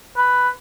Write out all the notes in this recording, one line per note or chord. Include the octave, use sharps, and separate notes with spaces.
B4